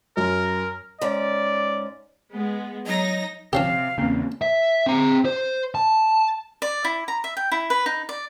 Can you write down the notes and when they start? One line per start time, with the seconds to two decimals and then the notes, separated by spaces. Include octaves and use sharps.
0.17 F#2 A#4
1.01 G#2 C#4 D5
2.32 G#3 B3
2.87 F#3 D#4 A#6
3.53 C3 F3 C#4 G4 F5
3.98 E2 C#3 A#3 C4
4.42 E5
4.87 C4 A#5
5.25 C5
5.75 A5
6.62 D5
6.84 E4
7.08 A#5
7.24 E5
7.37 G5
7.52 E4
7.70 B4
7.86 D#4
8.09 D5